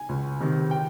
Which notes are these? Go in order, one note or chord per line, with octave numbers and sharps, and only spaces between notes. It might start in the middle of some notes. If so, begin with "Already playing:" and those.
Already playing: G#5
C#2
C3 D#3
G5